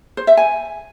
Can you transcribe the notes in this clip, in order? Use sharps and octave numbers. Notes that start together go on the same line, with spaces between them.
C5
E5
G#5